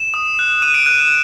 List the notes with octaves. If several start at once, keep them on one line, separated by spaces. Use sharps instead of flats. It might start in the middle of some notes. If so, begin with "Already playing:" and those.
Already playing: E7
D#6
F#6
D#6 D#7
D7
F#6 D#7
E7